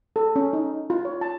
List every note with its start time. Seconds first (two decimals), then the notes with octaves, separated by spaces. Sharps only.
0.16 A4
0.36 C#4
0.53 D#4
0.90 F4
1.05 C#5
1.21 A5